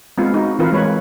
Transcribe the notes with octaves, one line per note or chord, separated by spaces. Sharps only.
G#3 B3 C4 F4
D#4 F#4
E3 C4 F4 A#4 B4
G#3 B4 C#5